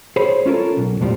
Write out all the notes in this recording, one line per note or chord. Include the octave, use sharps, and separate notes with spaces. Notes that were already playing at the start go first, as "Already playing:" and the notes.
G#4 C5 C#5 B5
C#4 F4 A4 A#4
B1
F2 A2 F3 G3